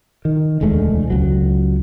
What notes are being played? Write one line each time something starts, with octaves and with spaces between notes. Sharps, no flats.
D#3
E1 D2 G#3 A3
C#2 F#3